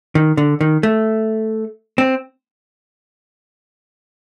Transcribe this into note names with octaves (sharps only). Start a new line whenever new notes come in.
D#3
D3
D#3
A3
C4